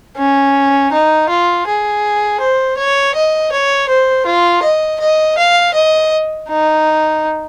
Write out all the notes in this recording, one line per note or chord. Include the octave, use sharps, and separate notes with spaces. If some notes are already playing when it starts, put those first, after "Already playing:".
C#4
D#4
F4
G#4
C5
C#5
D#5
C#5
C5
F4
D#5
D#5
F5
D#5
D#4